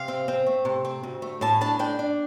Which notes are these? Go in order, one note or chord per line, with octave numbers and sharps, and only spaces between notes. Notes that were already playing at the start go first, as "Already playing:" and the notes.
Already playing: C3 F5
C4
C4
A3
C3
C4
D2
A3
A2 A5
D4 A5
D4 G5
D4